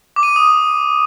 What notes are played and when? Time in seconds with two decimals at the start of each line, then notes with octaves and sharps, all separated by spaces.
0.16 D6
0.23 D#7
0.30 D6
0.36 D#6